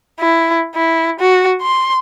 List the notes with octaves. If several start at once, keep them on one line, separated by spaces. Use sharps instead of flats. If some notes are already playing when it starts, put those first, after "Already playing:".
E4
E4
F#4
C6